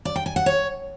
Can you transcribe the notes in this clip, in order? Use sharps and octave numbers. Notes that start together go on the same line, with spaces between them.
D5
G5
G#5
F#5
C#5